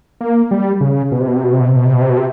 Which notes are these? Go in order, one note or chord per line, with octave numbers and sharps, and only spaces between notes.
A#3
G3
C#3
B2
C3
B2
C3
B2
C3
B2
C3
B2
C3
B2
C3
B2
C3